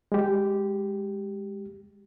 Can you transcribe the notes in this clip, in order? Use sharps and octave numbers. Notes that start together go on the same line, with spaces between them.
G#3 G4